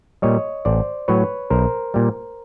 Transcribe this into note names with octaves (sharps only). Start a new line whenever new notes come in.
A#2 G3 C#5 D#5
A1 C5 D5
A2 F#3 B4 C#5
B1 A#4 C5
A#2 G3